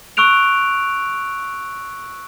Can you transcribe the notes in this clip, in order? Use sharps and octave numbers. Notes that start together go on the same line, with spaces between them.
C#6 E6 F#6 D7 F7